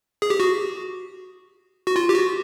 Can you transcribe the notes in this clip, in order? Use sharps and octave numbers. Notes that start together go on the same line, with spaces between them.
G#4
G4
F#4
F#4
F4
G4
F#4